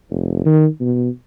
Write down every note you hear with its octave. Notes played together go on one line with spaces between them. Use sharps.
F1
D#3
B2